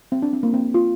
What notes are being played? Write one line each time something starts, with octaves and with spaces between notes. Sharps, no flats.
C4
D4
C4
A#3
C4
F4